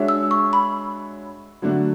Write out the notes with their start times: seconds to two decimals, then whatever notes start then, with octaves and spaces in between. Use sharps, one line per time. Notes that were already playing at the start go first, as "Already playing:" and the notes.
Already playing: G#3 D4 F#4 C#5 E5
0.08 E6
0.31 C#6
0.53 B5
1.62 D3 F#3 A3 D4 F#4